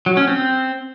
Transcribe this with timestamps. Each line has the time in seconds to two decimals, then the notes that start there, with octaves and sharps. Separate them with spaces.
0.06 F#3
0.17 C#4
0.28 C4